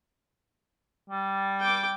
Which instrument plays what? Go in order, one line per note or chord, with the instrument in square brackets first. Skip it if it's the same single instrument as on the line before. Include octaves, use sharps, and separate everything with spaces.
[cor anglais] G3
[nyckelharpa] G5 D6